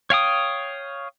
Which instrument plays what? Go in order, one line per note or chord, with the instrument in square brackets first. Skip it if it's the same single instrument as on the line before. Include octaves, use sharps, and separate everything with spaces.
[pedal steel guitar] C#5 F5 G5 D#6